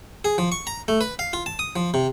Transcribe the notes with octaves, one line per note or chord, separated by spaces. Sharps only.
G#4
F3
C#6
A#5
A3
B4
F5
F4
A5
D#6
F3
C3